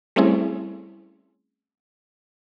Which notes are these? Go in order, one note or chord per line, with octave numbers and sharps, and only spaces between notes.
G3 A3 C4 C#4 E4 G#4